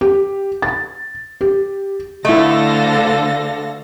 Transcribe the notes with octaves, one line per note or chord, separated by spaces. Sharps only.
G4
A6
G4
D2 D3 A3 E4 A4 D#5 F5 A#6